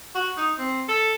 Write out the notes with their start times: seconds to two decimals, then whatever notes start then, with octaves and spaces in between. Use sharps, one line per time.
0.15 F#4
0.37 D#4
0.58 C4
0.88 A4